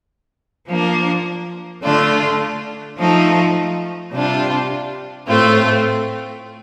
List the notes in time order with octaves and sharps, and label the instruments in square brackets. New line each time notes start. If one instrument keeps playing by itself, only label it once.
[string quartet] F3 A#3 D4
D3 A3 D4 F4
F3 A3 D#4
C3 G3 D4 F4
A2 A3 C4 F4